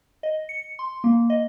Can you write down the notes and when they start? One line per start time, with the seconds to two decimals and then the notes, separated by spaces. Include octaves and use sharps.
0.23 D#5
0.49 C#7
0.79 C6
1.04 A#3
1.30 D#5